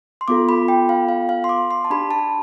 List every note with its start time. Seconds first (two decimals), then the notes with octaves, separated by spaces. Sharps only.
0.21 C6
0.28 B3 F4 A4 D6
0.49 B5
0.68 G5
0.89 F5
1.09 F5
1.29 F5
1.44 C6
1.49 D6
1.71 C6
1.85 A5
1.90 D4 G4 B5
2.11 A5